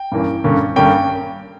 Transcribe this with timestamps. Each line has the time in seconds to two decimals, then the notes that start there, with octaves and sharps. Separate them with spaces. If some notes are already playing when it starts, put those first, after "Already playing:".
Already playing: G5
0.12 G2 E3 A#3 C#4
0.44 G2 D3 A#3 C#4
0.76 G2 D3 A#3 C#4 G5